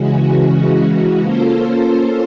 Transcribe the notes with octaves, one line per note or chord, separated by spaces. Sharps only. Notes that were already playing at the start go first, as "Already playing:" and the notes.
Already playing: C#3 E3 G#3 C#4 F#4
A#3 C#4 F4 A4 C5